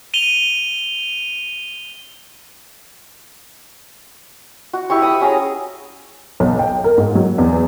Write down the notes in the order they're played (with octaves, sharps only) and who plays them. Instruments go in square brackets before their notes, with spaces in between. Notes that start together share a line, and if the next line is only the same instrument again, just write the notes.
[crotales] D#7 F7 G7
[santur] F#4
E4 G4 C#6
B5 D#6
C#4 F#4 G#4 A#5
[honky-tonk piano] B1
G5
A#4
G#2
F#3
E2